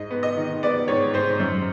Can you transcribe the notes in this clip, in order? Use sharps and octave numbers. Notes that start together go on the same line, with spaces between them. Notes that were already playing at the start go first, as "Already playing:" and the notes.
Already playing: G#2 D#5
B3
D#5
D#3
B3 D5
G#2 C#5
G#2 C5
F#2